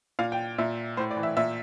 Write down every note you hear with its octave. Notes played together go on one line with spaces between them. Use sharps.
A#2 F5
G5
A#2 E5
A2 C5
D5
E3
E5
A#2 E5